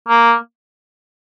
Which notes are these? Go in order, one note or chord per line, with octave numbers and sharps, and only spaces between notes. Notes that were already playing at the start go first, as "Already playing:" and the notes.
A#3